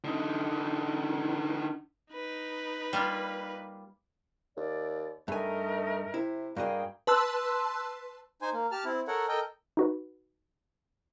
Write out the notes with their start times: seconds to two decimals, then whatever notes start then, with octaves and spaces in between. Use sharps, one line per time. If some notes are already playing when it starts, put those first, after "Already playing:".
0.04 D3 D#4
2.12 D#4 B4
2.93 G3 A#3 F4
4.57 D#2 D5
5.28 G2 A3 D#4 A#4 D#5 G#5
6.14 C3 E4
6.56 G2 A#3 F#4 G#4 D#5 G5
7.07 B4 A5 C6 E6 F#6
8.42 D#4 C5 G#5
8.54 A#3
8.72 G4 A5 F6
8.85 C4 E4
9.08 A4 A#4 C#5 F#5
9.29 A4 A#4 D#5 G5
9.77 D#4 F#4 B4